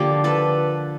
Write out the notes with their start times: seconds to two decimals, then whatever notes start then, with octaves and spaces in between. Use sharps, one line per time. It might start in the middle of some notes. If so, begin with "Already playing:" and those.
Already playing: D3 F3 A#3 G4
0.24 A4 B4